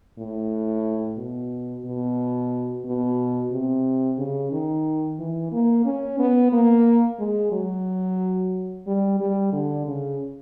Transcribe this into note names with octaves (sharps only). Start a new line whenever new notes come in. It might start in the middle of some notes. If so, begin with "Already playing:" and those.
A2
B2
B2
B2
C3
C#3
D#3
E3
A#3
C#4
B3
A#3
G#3
F#3
G3
G3
D3
C#3